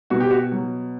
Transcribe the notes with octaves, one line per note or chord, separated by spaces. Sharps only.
B2 F#4
G4
F#4
F#3